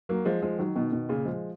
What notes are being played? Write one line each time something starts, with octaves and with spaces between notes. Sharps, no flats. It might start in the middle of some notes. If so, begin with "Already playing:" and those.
F#3 A#3
F3 G#3
F3 G#3
D#3 F#3
B2 D#3
B2 D#3
A#2 C#3
F3 G#3